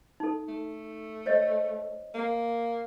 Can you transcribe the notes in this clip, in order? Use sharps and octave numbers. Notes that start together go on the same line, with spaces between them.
D#4 A4
A3
C5 C#5 D#5
A#3